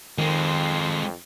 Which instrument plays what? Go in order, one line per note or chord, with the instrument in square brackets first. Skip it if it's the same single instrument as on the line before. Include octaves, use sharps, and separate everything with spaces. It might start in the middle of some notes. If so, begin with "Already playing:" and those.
[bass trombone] F2 [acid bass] D#3 [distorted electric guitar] G#3 C4